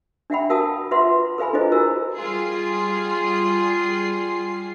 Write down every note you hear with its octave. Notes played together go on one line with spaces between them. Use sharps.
D4 E5 F#5 G5 B5
F#4 A#4 F5 A5 D#6
F4 B4 E5 F#5 C6
A4 B4 F5 G#5 B5
D4 E4 F4 G#4 C5 D#5
E4 F#4 A#4 E6
G3 F4 G#4 C7